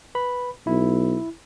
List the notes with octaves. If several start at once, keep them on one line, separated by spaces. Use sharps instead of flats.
B4 B5
B1 E4